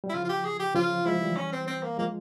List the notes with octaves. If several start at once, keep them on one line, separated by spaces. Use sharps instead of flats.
G3
E4
C#3 F3 F4
F4
G4
G#4
G4
C#3 F3 F4
F3 G#3 E4
E3 G3
C#4
C4
C4
A#3
F3 G#3 A#3